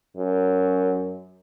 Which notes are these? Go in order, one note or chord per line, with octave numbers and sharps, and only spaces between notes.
F#2